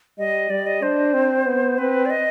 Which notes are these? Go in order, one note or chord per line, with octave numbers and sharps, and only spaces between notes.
G3 D#5
G3 D5
D#5
D4 C5
C4
B3
C4 B4
D5
D#5